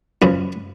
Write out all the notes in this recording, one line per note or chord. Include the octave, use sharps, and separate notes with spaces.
F#2 C#3 F3 B3 F#4